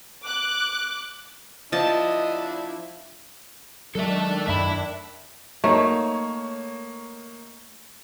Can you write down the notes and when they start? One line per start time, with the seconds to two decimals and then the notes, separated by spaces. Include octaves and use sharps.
0.23 D6 F#6
1.72 F3 D4 E4 D#5 A5
3.95 D#3 F#3 G#3 D4 A4 E5
4.47 F#2 A3 E5 B5
5.64 A3 A#3 D#4 C#5